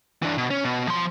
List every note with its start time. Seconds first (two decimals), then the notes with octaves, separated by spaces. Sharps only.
0.23 E3 D4
0.38 B2
0.51 C#4
0.64 B2
0.88 F3 C6